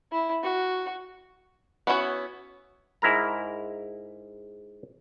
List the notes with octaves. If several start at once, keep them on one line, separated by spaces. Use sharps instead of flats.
E4
F#4
B3 C#4 E4 F#4 C#5
G#2 E4 A#4 A#5